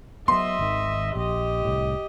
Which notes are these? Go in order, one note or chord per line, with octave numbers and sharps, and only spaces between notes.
F#3 B3 D#5 E5 C6
G#1 D#3
A#1 G4 D#5
C2 A2